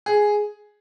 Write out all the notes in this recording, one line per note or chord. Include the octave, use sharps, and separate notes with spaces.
G#4